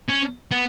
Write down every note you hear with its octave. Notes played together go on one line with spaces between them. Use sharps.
C#4
B3